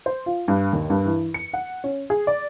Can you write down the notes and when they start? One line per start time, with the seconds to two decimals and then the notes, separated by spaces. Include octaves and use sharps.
0.06 C5
0.26 F4
0.48 G2
0.73 D#2
0.90 G2
1.05 E3
1.34 C#7
1.53 F#5
1.84 C#4
2.10 G#4
2.27 D5